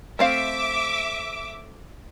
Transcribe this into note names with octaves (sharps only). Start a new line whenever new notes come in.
A3 C4 E5 F5 D6